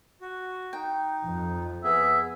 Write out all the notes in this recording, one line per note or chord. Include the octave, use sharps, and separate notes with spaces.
F#4
D#4 G5
F2
B3 G#4 E5